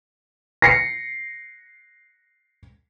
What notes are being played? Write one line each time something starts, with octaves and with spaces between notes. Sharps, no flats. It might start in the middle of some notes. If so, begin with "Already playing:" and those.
A#6 C7 C#7